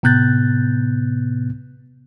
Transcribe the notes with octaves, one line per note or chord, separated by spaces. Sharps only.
A2 C3 B3 F#6 G6 A6